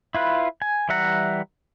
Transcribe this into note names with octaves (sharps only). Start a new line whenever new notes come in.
E4 F4 B4
G#5
E3 G3 E5 F#5 A#5